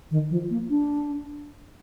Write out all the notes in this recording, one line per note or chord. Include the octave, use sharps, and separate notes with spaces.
D#3
F3
A#3
D4